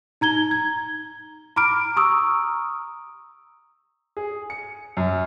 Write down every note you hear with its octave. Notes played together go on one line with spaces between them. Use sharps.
D#4 A#5 G#6 G7
G#6
A#5 B5 D6 F6 D7
A#5 C#6 D#6 E6
G#4
C#7
F#2